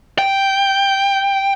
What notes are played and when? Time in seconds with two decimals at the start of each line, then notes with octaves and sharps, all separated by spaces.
0.18 G5